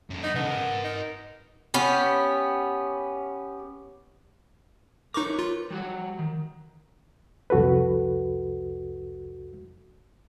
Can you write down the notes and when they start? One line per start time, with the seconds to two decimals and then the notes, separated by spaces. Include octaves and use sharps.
0.10 F#2 D3
0.23 B3 D#4
0.35 C#3 B3 A4
0.51 A#4 G#5
0.84 D#4
1.74 B3 C#4 G4
5.14 D#4 A#4 B4 C#5 C#6 D6
5.39 F4
5.70 G3 F#4 F#5
6.19 D#3
7.50 C2 F2 F#4 A4 B4